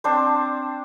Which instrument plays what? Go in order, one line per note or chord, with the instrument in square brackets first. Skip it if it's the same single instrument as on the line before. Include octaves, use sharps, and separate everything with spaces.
[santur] C4 D4 C5